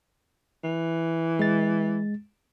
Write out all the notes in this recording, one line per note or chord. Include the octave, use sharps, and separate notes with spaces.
E3
G#3 A6